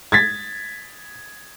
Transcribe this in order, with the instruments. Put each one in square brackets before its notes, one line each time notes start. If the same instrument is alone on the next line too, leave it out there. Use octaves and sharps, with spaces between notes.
[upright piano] G#6 A6 B6